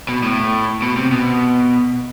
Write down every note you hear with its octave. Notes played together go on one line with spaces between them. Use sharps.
B2
A2
B2
C3
B2